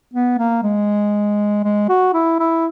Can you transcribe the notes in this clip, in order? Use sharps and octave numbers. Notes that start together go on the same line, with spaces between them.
B3
A#3
G#3
G#3
F#4
E4
E4